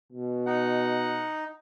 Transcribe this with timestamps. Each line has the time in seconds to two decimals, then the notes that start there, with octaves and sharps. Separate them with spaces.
0.12 B2
0.47 D#4 F#5